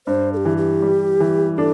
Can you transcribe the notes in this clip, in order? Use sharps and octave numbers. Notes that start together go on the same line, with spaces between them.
G2 C5
A4
G4
E3
G4
G3
E3
D4 A4